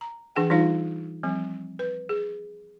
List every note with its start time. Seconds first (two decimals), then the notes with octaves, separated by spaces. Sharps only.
0.01 A#5
0.36 E3 D4 G#4 F#5 G5
0.50 E3 G3 D#4 F4 C#5 F5
1.23 F3 G3 C4
1.79 B4
2.09 G#4